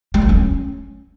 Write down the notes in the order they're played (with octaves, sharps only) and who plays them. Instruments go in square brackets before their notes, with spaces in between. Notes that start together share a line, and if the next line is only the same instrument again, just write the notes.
[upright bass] G3
F#3
C#4